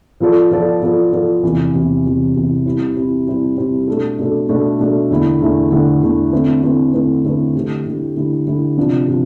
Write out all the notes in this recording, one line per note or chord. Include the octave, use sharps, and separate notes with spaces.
F3 B3 F4 A4 D5
F3 B3 F4 A4 D5
F3 B3 F4 A4 D5
F3 B3 F4 A4 D5
E2 C3 E3
E2 C3 E3
E2 C3 E3
E2 C3 E3
G3 C4 E4 G4
G3 C4 E4 G4
G3 C4 E4 G4
G3 C4 E4 G4
B2 A3 D4 A4
B2 A3 D4 A4
B2 A3 D4 A4
B2 A3 D4 A4
E2 D3 A3 E4
E2 D3 A3 E4
E2 D3 A3 E4
E2 D3 A3 E4
D3 A3 C4 E4 B4
D3 A3 C4 E4 B4
D3 A3 C4 E4 B4
D3 A3 C4 E4 B4
D3 A3 E4 G4
D3 A3 E4 G4
D3 A3 E4 G4
D3 A3 E4 G4
C3 F3 B3 D4
C3 F3